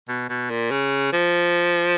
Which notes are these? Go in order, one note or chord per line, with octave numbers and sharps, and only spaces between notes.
B2
B2
A#2
C#3
F3